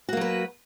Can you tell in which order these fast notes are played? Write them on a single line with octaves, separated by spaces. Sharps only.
F#4 A#3 F#3 B4